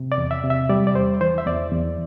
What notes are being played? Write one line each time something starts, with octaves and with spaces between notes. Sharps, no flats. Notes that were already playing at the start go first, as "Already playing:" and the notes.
Already playing: C3
D5
E2
E5
C3
E5
G3 D5
D5
E2 C5
E3 C5
E5
E2 D5
E2